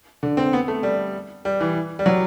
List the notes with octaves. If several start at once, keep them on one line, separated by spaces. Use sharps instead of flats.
D3
C4
B3
A3
G3
G3
E3
G3
F#3